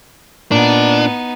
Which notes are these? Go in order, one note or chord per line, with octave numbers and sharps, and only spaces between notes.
A#2 B3 D4 D#4